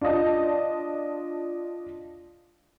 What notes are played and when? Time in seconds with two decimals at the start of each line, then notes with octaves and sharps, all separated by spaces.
0.01 D4 F4 D5 D#5 A5